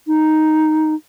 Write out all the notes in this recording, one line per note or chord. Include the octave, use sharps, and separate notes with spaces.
D#4